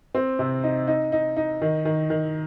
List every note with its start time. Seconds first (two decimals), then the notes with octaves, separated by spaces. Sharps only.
0.15 C4
0.39 C3
0.63 D#4
0.87 D#4
1.12 D#4
1.36 D#4
1.61 D#3
1.85 D#3
2.10 D#3